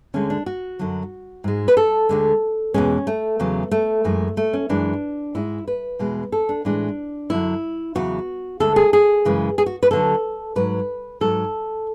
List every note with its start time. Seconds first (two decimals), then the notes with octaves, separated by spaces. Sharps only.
0.14 D2 D3 G#3 C#4
0.30 D4
0.46 F#4
0.79 F#2 D3 F#3
1.44 G#2 G#3
1.68 B4
1.77 A4
2.09 D2 D3 G#3
2.74 E2 B2 G#3 C#4
3.07 A3
3.40 E2 C#3 F#3
3.71 A3
4.04 F#2 E3 G#3
4.37 A3
4.53 C#4
4.69 F#2 E3 G#3 D4
5.35 G#2 G#3 E4
5.68 B4
5.99 E2 B2 G#3
6.32 A4
6.49 D4
6.65 A2 E3 G#3 D4
7.30 F#2 D3 F#3 E4
7.95 E2 C#3 F#3 F#4
8.60 D2 D3 G#3 A4
8.76 G#4
8.93 G#4
9.25 F#2 C#3 E3 G#3
9.58 G#4
9.66 F#4
9.83 B4
9.91 D2 D3 F#3 A4
10.56 G#2 F#3 B4
11.21 G#2 F#3 A4